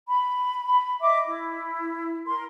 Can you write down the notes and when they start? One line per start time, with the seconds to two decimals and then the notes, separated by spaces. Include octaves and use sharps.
0.08 B5
1.01 D#5 E5 D6
1.25 E4
2.27 A#4 C6